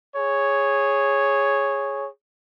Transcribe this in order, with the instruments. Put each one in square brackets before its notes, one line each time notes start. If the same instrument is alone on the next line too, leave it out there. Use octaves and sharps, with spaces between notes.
[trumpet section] G#4 C#5